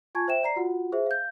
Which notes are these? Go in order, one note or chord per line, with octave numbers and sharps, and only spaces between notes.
F4 G#5 A5 C#6 G#6
C5 E5 G5 E7
D5 A#5 C7
F4 F#4 F#5
G#4 C5 E5
F5 G6